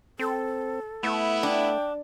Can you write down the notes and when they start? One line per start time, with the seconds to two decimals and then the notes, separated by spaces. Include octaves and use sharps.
0.19 C4 A4
1.03 A3 B3 E4
1.43 D4 G5